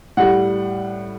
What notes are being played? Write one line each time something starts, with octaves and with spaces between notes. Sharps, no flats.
A2 G3 F#5